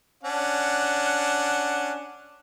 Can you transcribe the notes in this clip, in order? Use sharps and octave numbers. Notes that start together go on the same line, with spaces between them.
C#4 D4 F#5